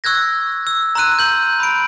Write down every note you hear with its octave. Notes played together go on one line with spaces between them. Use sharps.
C#6 E6 F#6 G#6 A#6
E6
A#5 C6 E6 F#6 D#7
G6 F#7
B5 D7